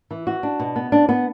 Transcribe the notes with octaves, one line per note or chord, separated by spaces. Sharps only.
E3
F#4
D4
B2
B3
D4
B3